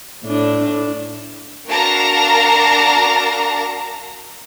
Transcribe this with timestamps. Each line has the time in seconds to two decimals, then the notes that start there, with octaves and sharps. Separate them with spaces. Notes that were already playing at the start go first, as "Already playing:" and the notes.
0.24 A2 D4
1.68 D4 F#4 A#4 F5 A5 A#5